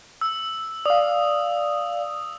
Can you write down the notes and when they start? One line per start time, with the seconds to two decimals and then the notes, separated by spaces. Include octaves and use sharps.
0.21 E6
0.86 D5 F5 D#6